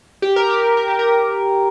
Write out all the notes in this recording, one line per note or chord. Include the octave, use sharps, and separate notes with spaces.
G4
A#4
G4
A#4
G4
A#4